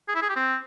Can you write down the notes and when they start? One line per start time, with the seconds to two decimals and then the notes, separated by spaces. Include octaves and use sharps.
0.08 G#4
0.15 E4
0.22 G#4
0.29 G4
0.36 C4